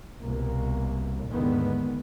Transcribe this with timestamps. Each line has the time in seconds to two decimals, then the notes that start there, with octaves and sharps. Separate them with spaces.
0.23 C2 B2 A#3
1.28 D#2 G#2 D3 D#3 G#3 B3